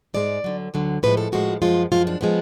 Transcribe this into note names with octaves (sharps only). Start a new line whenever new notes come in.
G#2 G#3 D5
D2 D3 F#3
D2 D3 F#3
A2 F3 G#3 B4
A4
A2 F3 G#3 F#4
F#2 F3 G#3 F4
F#2 F3 G#3 F4
D4
F3 G#3 B3